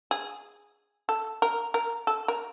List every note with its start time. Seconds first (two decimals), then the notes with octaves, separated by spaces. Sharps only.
0.11 G#4
1.09 A4
1.42 A#4
1.74 A#4
2.07 A4
2.28 A#4